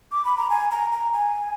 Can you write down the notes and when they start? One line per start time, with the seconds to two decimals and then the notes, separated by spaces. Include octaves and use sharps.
0.12 D6
0.25 B5
0.37 A#5
0.50 G#5
0.71 A#5
0.92 A#5
1.13 G#5